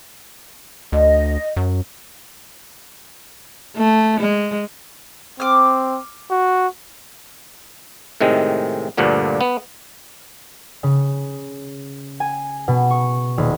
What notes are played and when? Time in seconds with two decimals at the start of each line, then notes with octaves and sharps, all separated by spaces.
0.92 D2 D#5
1.57 F#2
3.77 A3
4.20 G#3
5.40 C4 D6 F6
6.31 F#4
8.21 A2 C3 D#3 G#3
8.97 D2 G2 A#2 D3 F3
9.41 B3
10.83 C#3
12.20 G#5
12.68 B2
12.90 C#6
13.38 D#1